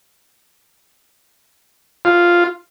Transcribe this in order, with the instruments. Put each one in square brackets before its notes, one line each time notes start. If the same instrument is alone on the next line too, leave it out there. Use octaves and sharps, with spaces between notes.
[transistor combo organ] F4